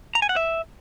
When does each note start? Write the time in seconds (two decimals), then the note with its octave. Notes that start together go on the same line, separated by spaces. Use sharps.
0.15 A#5
0.22 G#5
0.29 F#5
0.36 E5